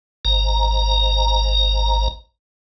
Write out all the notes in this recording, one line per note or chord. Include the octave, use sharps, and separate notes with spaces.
G#1 A#5